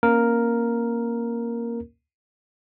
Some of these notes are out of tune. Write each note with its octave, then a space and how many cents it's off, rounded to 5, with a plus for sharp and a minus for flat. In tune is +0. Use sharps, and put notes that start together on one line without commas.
A#3 +0 C#4 -25 A#4 +0